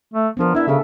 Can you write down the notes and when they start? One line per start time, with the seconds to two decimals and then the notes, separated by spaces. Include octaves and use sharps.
0.14 A3
0.37 F3 B3 D4 A#4
0.55 D4 E4 E5
0.68 C#3 C#4 G4 A4